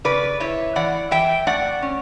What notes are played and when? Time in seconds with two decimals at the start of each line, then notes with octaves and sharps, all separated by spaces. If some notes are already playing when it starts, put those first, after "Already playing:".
0.04 C#3 B4 D5
0.40 E4 C#5 E5
0.75 E3 D5 F#5
1.11 E3 E5 G5
1.47 A3 D5 F#5
1.82 C#4